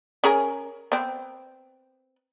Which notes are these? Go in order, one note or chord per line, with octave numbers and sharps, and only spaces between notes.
C#4 G#4 A#4
B3 C4